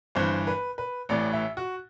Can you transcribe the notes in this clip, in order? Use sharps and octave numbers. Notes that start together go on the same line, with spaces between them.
G1 G2 E3 C5
B4
B4
A1 A2 E3 D5
E5
F#4